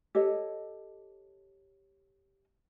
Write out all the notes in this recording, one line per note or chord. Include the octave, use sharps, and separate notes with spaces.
G4 A4 C#5 D#5